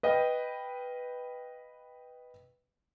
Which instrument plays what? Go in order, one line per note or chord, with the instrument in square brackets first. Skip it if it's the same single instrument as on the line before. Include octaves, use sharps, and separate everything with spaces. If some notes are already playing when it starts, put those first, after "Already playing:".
[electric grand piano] B4 D#5 F5 G5